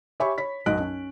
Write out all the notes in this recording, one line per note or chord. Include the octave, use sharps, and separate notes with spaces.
G4 C#5 E5 G#5 B5 C#6
C#5 B5 B6
B1 F#2 F#3 D#5 F#6 D7
C#4